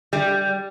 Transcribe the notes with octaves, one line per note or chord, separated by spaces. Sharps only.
G3